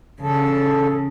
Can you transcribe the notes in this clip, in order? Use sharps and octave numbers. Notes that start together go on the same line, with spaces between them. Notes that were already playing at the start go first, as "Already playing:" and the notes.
C#3 A4